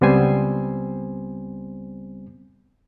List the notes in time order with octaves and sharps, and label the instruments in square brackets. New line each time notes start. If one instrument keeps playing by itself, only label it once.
[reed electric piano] C#2 G3 B3 C4 C5 G#5